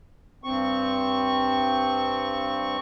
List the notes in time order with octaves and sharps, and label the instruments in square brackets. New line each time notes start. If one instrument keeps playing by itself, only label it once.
[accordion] G2 C4 C#6